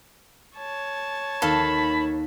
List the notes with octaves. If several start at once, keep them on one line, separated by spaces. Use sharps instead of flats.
C#5 A5
D#2 A4 A#4 F5 B5